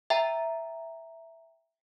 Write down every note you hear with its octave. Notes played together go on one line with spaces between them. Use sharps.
E5 G5 A#5